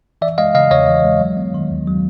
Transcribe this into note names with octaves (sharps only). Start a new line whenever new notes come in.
E3 D5 E5
G#3 D#5 F5
C#3 D#5 F5
E2 C#5 D#5
E3
G#3
F#3
B3
D#3
D#2
F#3